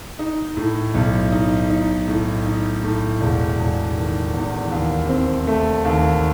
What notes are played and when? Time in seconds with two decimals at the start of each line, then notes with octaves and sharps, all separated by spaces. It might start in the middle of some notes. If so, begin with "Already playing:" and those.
0.19 D#4
0.57 A2
0.94 B1
1.32 D#4
1.70 D#4
2.07 A2
2.46 D#4
2.83 A2
3.21 E1
3.58 E1
3.96 D#3
4.34 E2
4.71 D#2
5.09 C4
5.47 A3
5.85 D#2